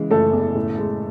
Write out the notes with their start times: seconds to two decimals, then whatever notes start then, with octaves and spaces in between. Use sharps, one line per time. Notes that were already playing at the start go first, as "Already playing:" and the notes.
Already playing: C#3 E3 G#3
0.11 F#1 A3 A4
0.33 E2
0.55 A2
0.78 G#3